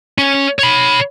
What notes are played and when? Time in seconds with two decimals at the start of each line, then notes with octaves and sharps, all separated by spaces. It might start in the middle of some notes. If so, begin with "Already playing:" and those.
0.18 C#4
0.59 C#5 B5